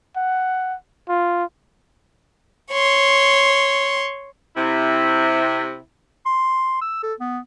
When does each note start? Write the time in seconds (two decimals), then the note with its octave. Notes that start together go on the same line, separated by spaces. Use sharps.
0.16 F#5
1.09 F4
2.72 C#5 C6
4.56 C3 E4
6.26 C6
6.81 E6
7.03 A4
7.20 B3